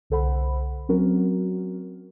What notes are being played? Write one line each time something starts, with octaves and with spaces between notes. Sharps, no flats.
C2 D3 A4 C5 F#5 B5
F#3 C4 C#4 F#4 A#4